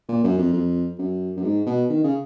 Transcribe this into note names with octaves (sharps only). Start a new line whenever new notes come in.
A#2
F#2
F2
F2
F#2
F#2
G#2
B2
D#3
C#3